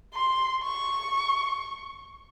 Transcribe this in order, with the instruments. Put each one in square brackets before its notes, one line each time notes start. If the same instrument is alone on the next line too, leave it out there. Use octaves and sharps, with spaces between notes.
[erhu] C6
C#6